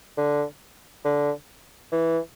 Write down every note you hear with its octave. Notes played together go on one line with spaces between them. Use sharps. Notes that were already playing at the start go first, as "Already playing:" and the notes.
D3
D3
E3